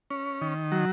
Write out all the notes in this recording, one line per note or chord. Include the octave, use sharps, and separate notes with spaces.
C#4
D#3
F#3